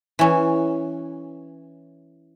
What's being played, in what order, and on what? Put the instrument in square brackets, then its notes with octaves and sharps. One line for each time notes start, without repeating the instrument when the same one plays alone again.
[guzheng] E3 C#4